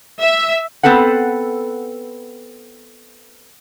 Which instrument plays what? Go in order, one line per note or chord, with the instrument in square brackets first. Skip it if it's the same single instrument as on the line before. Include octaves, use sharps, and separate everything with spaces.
[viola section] E5
[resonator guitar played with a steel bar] B3 C4 A4 B4 F#5